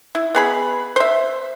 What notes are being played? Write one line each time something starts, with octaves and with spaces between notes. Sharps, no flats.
E4
B3 G#4 B5
C5 E5